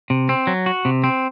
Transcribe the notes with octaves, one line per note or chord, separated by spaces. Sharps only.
C3
C4
F#3
F#4
C3
C4